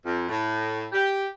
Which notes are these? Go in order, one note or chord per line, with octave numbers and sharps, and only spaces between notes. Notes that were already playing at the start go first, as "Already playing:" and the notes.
F2
A2
G4